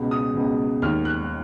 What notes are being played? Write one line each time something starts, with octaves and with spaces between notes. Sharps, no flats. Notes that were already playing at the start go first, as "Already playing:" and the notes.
Already playing: C#2 B2
D#6
C#2 B2
D#2 D#3 F6
F#6